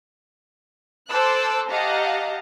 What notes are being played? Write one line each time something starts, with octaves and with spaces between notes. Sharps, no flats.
A4 C5 A5 D6 E6 F#6
G4 D#5 F5 F#5 A5 A#5